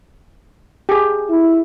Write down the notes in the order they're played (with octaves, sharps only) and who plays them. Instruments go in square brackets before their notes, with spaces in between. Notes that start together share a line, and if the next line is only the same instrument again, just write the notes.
[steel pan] G4 G#4
[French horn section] E4